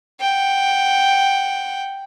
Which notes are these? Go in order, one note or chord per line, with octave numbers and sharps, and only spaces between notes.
F#5 G5